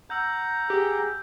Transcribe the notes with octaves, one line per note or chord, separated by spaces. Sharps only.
F#5 A#5 E6 G6
G4 G#4